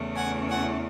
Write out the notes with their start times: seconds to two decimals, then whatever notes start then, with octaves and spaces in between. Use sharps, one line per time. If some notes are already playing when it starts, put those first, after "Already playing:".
Already playing: E2 C#3 E3 A3 C#4
0.15 F#5 G#5
0.49 F#5 G#5